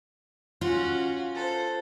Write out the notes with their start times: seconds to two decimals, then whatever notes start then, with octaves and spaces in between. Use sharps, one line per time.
0.61 C#4 F4 F#4
1.35 A4 C5